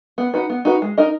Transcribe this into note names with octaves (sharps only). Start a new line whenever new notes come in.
B3
D#4 F#4 B4
B3
D#4 F#4 B4
G#3
D#4 A#4 D#5